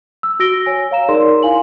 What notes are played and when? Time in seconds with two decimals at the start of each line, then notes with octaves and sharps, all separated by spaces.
0.23 E6
0.40 F#4 E6 A#6 D7 G7
0.66 C#5 G#5
0.91 C#5 F5 A#5 E7
1.09 D#4 G#4 A#4 D5 C6
1.43 E4 F5 G#5 C6 F#7